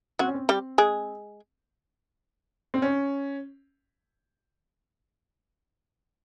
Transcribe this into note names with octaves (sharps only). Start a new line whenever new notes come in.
F#3 C4 F#4
C#4
C4
G3 G4
G#3 G#4
C4
C#4